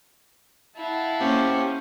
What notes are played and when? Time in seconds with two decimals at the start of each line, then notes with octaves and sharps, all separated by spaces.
0.77 E4 F5 F#5 A5
1.20 A#3 C#4 G4 C5